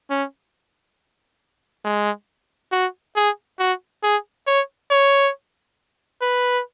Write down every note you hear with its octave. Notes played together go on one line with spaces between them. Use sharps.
C#4
G#3
F#4
G#4
F#4
G#4
C#5
C#5
B4